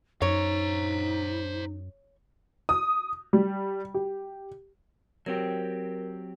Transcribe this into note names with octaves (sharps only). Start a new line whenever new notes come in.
F#2 D#4 C5 C#5 A#5
D#6
G3
G4
F#3 C4 G4 A#4